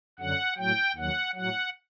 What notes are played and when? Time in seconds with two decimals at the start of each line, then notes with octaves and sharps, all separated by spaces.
0.19 F#2 D3 F#3 F#5
0.57 A2 F#3 G5
0.96 D#2 D#3 F#3 F#5
1.35 A2 F#3 F#5